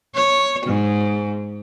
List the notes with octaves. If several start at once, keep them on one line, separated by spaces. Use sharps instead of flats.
C#5
G#2